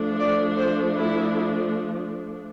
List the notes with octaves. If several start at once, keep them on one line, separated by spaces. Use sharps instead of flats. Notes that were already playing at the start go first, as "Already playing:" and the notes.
Already playing: F3 A3 D4
D5
C5
E4